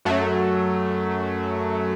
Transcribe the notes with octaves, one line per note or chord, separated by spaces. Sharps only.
F#2 F#3 A3